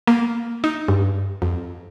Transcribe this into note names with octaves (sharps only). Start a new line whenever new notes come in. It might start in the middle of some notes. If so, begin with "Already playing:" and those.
A#3
D#4
G2
F2